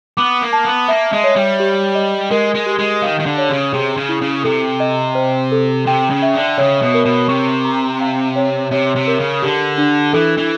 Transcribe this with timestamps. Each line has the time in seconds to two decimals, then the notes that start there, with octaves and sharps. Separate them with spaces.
0.17 B3 D6
0.41 A#3
0.53 A5
0.65 B3
0.88 A#3 E5
1.12 G#3
1.24 C#5
1.36 G3
1.60 G4
1.95 D#5
2.31 G#3 A#4
2.54 G#3
2.66 G4
2.78 G#3
3.02 D#3 F5
3.19 D#3
3.26 D3
3.38 C#5
3.49 C#3
3.73 C3 G#4
3.97 C#3
4.09 E4
4.21 C#3
4.44 C3 A4
4.80 D#5
5.15 C5
5.52 A4
5.87 C3 G5
6.10 C#3
6.22 E5
6.34 D3
6.58 C#3 C#5
6.82 B2
6.94 A#4
7.05 B2
7.29 C3 C#6
7.65 A#5
8.01 F5
8.36 C#5
8.71 C3 C#5
8.95 C3
9.07 A#4
9.19 C#3
9.42 D3 G4
9.78 D4
10.13 E3 A4
10.38 E3